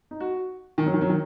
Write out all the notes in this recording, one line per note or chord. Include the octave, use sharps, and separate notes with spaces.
D#4
F#4
D#3
F#3
D#3
F#3
D#3